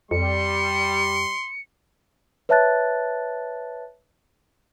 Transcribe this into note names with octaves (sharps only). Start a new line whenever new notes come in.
F2 G3 C6 C#7
B4 C#5 E5 A5 F#6 A6